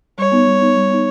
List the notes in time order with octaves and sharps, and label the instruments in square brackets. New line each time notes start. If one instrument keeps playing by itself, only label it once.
[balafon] G3 [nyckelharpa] C#5
[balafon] B3 D#4
G3
B3 D#4
G3
B3 D#4